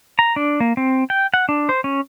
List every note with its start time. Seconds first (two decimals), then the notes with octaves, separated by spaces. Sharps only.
0.19 A#5
0.36 D4
0.60 A#3
0.77 C4
1.10 G5
1.34 F#5
1.49 D4
1.69 C5
1.84 C#4